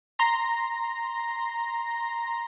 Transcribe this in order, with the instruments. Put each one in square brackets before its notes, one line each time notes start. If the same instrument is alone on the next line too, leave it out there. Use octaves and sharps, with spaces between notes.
[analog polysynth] A#5 C6 A#6